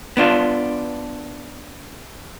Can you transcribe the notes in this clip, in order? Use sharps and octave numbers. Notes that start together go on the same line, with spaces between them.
B3 D4 F4